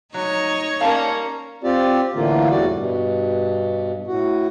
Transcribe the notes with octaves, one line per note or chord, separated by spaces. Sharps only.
F#3 D#4 C#5
G3 A#3 C#4 F5 A5
C4 F4 G4 D5
A2 D3 E3 A#3 F4
E2 A2 G3 F#4 D5
G2 B2
A2 F#4